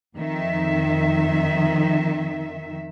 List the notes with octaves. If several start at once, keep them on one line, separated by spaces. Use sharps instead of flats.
F2 D#3 E5